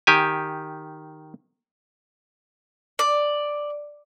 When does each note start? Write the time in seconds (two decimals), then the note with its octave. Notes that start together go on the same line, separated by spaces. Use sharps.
0.07 D#3 G4 G#5
2.99 D5